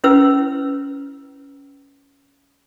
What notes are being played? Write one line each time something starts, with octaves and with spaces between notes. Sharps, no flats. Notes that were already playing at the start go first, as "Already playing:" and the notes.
C#4 E4 B4 E6